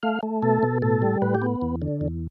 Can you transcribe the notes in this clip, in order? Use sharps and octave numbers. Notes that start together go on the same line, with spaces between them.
A3 F5
A3
B2 A4
B2
A2 A4
G3
A2 B4
G4
B3
E2
D3
E2